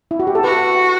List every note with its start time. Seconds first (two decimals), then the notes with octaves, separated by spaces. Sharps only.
0.11 E4
0.20 F#4
0.27 G4
0.35 A4
0.44 F#4 B4